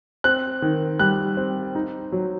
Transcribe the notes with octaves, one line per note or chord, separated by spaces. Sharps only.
C4 F#6
D#3
G3 F#6
C4
D#4
F#3